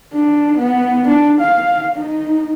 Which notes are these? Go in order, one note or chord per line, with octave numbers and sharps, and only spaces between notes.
D4
B3
D4
F5
D#4